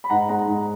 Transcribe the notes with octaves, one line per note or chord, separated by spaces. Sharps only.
B5
G#2 F#5 A#5
G#3 F#5 A#5
G#2